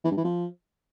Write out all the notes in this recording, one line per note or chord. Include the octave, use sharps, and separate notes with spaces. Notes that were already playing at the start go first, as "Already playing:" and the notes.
E3
G2
E3
F3